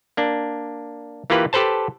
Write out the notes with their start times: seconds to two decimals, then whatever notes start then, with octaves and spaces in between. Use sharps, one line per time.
0.17 A#3 D4
1.30 E3 A#3 F4 G4 B4
1.53 G4 A4 B4 C5 A5